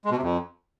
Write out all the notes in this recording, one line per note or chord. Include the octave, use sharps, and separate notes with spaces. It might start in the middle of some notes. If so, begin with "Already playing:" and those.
G#3
B2
C3
F2